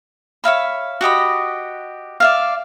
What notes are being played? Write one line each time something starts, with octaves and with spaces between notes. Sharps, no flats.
C#5 E5 F5 B5
F#4 G4 D#5 B5
D5 E5 F5